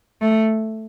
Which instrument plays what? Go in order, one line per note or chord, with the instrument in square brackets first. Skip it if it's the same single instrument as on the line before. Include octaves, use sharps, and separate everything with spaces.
[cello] A3